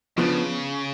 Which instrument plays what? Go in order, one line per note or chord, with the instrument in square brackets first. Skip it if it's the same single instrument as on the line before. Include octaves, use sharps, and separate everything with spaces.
[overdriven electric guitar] C#3 [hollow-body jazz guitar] F3 B3 D4